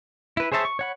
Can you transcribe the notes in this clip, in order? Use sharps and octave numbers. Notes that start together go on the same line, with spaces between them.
E4 B4
G#4 C5 C#5 E5 A5
C#6
C#5 F#5 B5